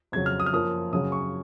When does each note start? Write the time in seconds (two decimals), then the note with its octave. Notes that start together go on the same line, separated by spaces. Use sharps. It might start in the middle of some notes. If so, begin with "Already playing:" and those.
0.12 F2 C#3 F#3 G#6
0.26 F6
0.40 D#6
0.46 F6
0.53 F#2 F3 A#3 D#6
0.93 F#2 C#3 F#3 D#6
1.12 C#6